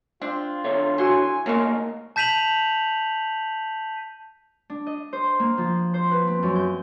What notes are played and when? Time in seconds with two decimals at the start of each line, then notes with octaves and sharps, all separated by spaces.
0.22 C4 D4 F4
0.65 D3 C#5 E5
0.98 E4 F#4 G#5 C6
1.46 D2 F#3 G#3 A#3 A#4 C6
2.16 A5 G6 B6 D#7 F7 F#7
4.70 D4
4.87 D#5
5.13 C5
5.39 A#3
5.58 F3
5.94 C5
6.11 B4
6.27 C4
6.43 F#2
6.56 G6